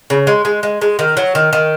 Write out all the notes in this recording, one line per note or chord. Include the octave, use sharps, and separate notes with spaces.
C#3
G#3
G#3
G#3
G#3
D#3
F#3
D#3
D#3